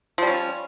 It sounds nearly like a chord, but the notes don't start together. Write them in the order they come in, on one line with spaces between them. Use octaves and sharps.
F3 G3 C#4